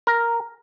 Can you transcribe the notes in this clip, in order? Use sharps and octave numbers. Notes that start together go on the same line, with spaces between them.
A#4